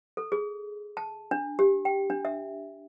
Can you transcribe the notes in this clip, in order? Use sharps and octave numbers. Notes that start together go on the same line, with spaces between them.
A4
G#4
A5
D4
G4
G5
D4
E5